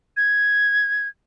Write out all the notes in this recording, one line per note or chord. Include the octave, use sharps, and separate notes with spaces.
G#6